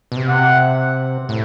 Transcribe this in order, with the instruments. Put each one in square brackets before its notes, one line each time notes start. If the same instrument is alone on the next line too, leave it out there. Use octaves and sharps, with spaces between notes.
[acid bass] B2
C3
[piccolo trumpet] F#5
[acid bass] A2